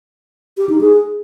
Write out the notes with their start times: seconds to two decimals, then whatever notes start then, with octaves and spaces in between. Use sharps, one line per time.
0.58 G4
0.69 D#4
0.81 G#4